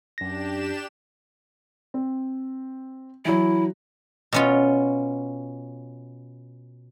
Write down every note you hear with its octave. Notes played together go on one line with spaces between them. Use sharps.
F#2 D4 G4 A#6 E7
C4
E3 F#3 E4
B2 C#4 F4